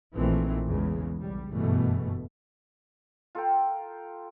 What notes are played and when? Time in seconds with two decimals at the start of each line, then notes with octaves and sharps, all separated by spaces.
0.15 A#1 A#2 D#3 E3 A3 C4
0.66 E2 C#3 G#3
1.17 B1 G3
1.50 F#1 G2 B2 E3 A3
3.35 F4 A4 A#4 G5